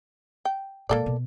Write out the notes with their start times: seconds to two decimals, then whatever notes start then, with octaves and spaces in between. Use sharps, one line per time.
0.45 G5
0.89 A#2 G#3 A#3 A4 D5
1.06 B2